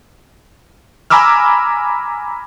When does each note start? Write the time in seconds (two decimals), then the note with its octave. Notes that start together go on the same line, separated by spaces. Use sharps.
1.10 G#5 A#5 B5 D6 E6 F6